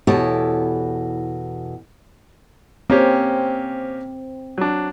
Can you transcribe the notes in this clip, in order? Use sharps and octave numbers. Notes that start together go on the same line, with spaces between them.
E2 B2 E4 G4 A4 C#5
A#3 C4 C#4 G4
F#3 D4